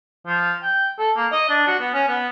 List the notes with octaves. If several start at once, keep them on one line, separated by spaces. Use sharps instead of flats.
F3
G5
A4
A#3
D#5
D4
F#4
B3
C#4
B3